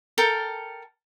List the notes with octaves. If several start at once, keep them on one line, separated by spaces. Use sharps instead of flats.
A4 A#4 G5